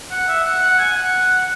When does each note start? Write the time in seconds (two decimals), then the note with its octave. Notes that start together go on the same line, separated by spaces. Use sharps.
0.11 F#5
0.28 E5
0.44 F#5
0.63 F#5
0.79 G#5
0.96 F#5